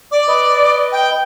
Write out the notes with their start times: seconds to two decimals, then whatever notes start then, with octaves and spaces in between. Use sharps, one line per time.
0.12 D5 D6
0.28 B4 D#5
0.92 G5